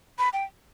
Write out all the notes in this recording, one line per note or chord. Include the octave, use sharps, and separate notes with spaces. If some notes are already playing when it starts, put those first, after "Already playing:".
B5
G5